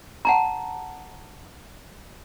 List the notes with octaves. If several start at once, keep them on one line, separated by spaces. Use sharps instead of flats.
F#5 A5 A#5